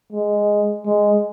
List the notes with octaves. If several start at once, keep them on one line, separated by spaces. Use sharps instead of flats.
G#3
G#3